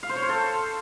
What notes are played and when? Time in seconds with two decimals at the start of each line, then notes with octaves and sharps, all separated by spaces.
0.03 F5
0.09 C5
0.16 C#5
0.22 C5
0.29 A4